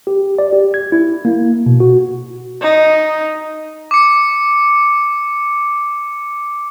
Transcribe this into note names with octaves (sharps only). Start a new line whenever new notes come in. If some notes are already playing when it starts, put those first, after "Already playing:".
G4
D5
G4
G#6
E4
A#3
B2
F#4
D#4
D6 C#7